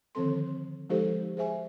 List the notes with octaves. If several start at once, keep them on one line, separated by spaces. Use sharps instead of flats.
D3 D#3 F3 C4 A4 C6
F3 G#3 D#4 G4 A4 C5
G#4 C5 E5 G#5